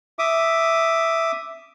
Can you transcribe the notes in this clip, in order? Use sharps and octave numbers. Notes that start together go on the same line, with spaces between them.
E5 D6 D#6